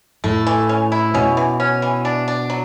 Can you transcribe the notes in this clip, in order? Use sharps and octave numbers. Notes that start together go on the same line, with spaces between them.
A2 A3
E3
C#4
E4
B2 C#4
E3
C#4
E3
D4
D4
F#3